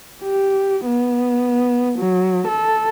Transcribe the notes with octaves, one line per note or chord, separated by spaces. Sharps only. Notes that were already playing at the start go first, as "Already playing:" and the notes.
G4
B3
F#3
A4